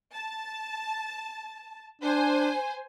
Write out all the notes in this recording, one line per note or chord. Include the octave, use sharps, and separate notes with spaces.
A5
D4 C5 G#5